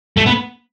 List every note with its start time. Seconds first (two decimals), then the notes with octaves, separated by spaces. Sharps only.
0.18 A3
0.27 B3